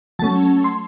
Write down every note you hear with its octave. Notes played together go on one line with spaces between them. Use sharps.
F#3 A3 C#4 A5
C6